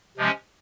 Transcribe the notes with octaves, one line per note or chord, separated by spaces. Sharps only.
C3 F3 G#3 C#4